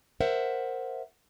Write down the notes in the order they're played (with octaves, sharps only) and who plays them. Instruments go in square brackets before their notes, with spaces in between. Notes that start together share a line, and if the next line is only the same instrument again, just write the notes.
[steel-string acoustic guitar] A#4 C5 E5 F#5